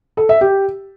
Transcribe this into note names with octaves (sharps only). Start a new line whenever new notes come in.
A4
E5
G4